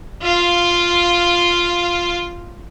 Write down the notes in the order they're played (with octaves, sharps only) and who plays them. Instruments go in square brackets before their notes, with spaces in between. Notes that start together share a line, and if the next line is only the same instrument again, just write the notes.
[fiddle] F4 F5